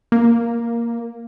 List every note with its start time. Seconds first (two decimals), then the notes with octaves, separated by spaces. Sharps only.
0.12 A#3